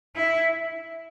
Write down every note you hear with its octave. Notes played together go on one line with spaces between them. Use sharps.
E4